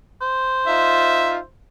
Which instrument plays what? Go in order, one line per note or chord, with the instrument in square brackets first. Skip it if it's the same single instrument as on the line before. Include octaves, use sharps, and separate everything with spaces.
[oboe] C5
[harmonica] D#4 F4 [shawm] E5